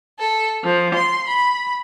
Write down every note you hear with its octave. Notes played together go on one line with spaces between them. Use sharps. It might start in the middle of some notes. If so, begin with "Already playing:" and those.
A4
F3
C6
B5